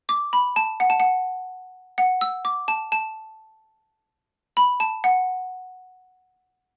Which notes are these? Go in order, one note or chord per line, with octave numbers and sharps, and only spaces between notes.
D6
B5
A5
F#5
A5
F#5
F#5
E6
D6
A5
A5
B5
A5
F#5